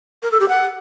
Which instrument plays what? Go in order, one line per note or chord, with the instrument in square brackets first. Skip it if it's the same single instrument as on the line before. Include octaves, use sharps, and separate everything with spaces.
[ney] A#4
A4
G4
F#5